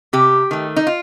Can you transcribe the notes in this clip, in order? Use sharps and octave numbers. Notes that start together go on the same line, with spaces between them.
C3 G4
D#3 A3
D#4
F4